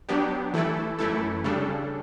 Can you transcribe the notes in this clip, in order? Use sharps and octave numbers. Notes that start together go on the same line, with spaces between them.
F#3 B3 D4 G4
E3 A3 E4 A4
F#2 E3 A3 E4 A4
C#3 G3 D4 A4